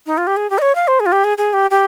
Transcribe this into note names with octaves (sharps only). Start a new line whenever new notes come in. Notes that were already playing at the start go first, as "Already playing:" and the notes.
D#4
F4
G4
G#4
G4
D#5
C#5
F5
C5
G#4
F4
G4
G#4
G#4
G4
G4